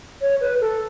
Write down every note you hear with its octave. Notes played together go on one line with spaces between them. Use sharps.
C#5
B4
A4